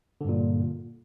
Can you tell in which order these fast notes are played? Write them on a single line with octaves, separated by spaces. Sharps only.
D3 G2 A#2